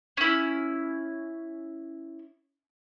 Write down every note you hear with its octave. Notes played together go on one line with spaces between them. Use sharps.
C#4 E4